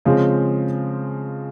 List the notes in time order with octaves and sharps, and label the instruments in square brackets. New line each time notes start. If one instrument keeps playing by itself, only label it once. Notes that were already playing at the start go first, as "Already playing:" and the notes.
[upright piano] C#3 F3 G#3 C4